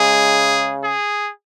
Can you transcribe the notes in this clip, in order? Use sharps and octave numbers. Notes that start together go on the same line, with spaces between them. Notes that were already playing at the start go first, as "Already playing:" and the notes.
Already playing: C#3 G#3 G#4
G#4